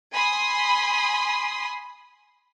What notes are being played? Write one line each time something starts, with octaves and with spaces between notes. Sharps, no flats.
G#5 B5 C6 D#6